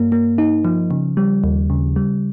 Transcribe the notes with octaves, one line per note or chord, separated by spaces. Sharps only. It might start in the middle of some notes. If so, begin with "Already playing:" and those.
Already playing: G2 A#3
A#3
D#4
F3
C#3
G3
D#2
C#3
G3